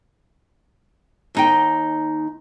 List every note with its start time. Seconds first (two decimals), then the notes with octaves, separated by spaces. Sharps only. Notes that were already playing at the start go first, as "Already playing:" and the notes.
1.35 D#2 D#4 G5